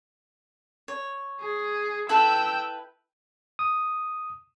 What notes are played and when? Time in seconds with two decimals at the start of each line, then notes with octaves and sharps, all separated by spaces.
0.88 C#5
1.41 G#4
2.09 E4 A4 B4 G5 E6
3.59 D#6